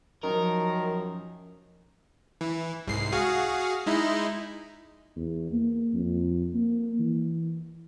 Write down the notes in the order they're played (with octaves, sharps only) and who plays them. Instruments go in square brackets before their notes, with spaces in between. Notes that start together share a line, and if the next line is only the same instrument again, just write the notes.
[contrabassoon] F#2 [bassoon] D#3 [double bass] F3 [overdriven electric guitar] A#4
[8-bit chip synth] E3
C2 G#2 C7
F#4 G#4 F5
G#3 D#4 E4
[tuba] E2
A#3
F2
A#3
E3